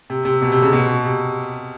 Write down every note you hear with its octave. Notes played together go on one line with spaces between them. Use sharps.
C3
C3
B2
C3
C#3
B2
C3